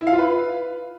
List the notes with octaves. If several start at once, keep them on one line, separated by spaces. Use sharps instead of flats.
E4
F5
F4
B4